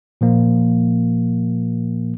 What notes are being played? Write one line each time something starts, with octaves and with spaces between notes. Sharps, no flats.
A#2 F3 A#3